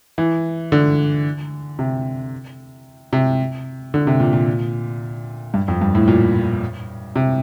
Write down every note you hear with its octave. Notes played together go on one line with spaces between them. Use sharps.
E3
D3
C3
C3
D3
C3
A#2
A#2
G2
F2
G2
A2
A#2
C3